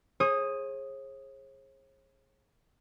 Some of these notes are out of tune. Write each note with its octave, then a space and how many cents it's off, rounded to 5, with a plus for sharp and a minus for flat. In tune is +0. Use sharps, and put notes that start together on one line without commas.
G#4 +0 C#5 -45 D#6 +0